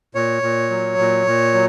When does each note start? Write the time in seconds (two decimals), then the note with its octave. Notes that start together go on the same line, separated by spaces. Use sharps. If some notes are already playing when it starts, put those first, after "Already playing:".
0.15 A#2 C#5
0.43 A#2
0.70 F#3
0.99 A#2
1.27 A#2
1.54 F#3